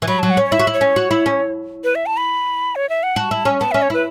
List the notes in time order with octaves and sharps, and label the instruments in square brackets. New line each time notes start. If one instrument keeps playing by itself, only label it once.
[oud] E3
[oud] F#3 [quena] B5
[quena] A5
[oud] F#3
[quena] F#5
[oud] C#4
[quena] C#5
[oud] E4 [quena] E5
[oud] F#4
E4
[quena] C#5
[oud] C#4
F#4
E4
C#4
[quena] B4
E5
A5
B5
C#5
E5
F#5
[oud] F#4 [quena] A5
[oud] E4
C#4
[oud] B3 [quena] A5
[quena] E5
[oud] C#4
[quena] C#5
[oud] E4 [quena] B4